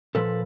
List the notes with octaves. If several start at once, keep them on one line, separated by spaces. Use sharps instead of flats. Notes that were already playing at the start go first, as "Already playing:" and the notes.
A#2 F3 A4 B4